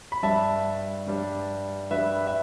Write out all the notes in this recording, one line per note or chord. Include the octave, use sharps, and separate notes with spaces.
B5
G2 G3 D4 E5 A5
G2 G3 D4
G2 G3 D4 B4 E5
E5